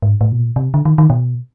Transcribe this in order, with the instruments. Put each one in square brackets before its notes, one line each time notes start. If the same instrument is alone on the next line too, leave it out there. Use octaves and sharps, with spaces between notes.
[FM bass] G#2
A2
B2
A#2
C3
D3
D#3
D#3
B2